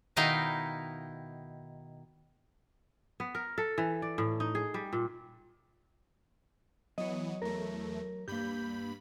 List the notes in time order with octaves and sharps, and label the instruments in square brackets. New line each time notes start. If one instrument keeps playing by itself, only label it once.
[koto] B2 D#3 D#4 E4 F5 G5
[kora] B3
A#4
A4
E3
D5
A2
D#4
G#4
G3
A#2
[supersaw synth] E3 B3 [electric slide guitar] F#3 C#5 [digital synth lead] D#5
[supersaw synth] E2 A3 [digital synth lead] A#4
[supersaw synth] G2 B5 [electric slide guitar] A#3 G4 [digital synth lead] G6